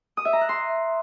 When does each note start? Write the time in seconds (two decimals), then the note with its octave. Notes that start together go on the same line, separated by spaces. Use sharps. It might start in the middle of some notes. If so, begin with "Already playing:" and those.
0.17 D#6
0.25 E5
0.33 A#5
0.41 F#6
0.49 C6